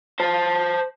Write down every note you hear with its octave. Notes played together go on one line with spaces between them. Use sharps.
C5 A5